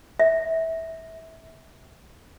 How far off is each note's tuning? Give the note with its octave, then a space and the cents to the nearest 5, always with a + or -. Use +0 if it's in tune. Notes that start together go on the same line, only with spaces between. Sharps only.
E5 -20